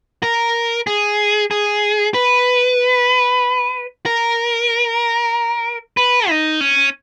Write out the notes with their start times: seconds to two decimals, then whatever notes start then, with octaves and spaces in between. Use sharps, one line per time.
0.23 A#4
0.87 G#4
1.51 G#4
2.14 B4
4.06 A#4
5.97 B4
6.29 D#4
6.61 C#4